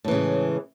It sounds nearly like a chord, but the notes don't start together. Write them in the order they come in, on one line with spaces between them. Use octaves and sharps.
A2 E3 C#3 G#3